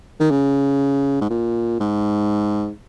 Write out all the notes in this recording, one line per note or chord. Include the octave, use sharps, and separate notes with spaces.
D#3
C#3
G#2
A#2
G#2